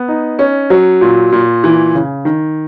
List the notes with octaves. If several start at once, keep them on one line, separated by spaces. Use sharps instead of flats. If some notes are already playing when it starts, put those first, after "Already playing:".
Already playing: B3
D#4
C#4
F#3
A#2
A#2
E3
C#3
D#3